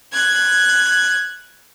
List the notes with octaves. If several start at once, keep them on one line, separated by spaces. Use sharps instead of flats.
F#6 G#6